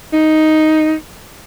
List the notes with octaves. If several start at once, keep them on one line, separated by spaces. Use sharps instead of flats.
D#4